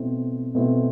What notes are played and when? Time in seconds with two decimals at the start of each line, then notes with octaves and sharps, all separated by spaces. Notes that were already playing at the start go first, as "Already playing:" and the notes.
Already playing: B2 A3 C4 E4
0.55 B2 A3 C4 E4